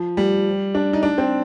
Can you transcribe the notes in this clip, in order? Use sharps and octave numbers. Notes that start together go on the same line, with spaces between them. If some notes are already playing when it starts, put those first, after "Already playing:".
Already playing: F3
G3
D4
D#4
D4
C4